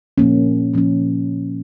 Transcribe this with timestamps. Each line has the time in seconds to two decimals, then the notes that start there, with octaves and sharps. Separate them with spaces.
0.18 A#2 F3 A#3 C#4
0.74 A#2 F3 A#3 C#4